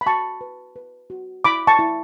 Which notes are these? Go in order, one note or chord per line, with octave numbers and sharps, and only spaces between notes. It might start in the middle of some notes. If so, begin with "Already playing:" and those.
B5
F#4 A5 C#6
B4
B4
F#4
E4 B5 D6
A5 C#6
E4